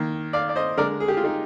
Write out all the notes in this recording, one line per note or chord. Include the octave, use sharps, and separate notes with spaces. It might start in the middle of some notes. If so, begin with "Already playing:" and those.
Already playing: D#3 A#3
D5 F5
D5
C5 D#5
D3 G#3 A#4 D5
G#4
G4
F4
D#4 G4